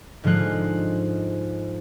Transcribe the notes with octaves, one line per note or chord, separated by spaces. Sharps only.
G#2 D3 F3 G#3 F4 F#6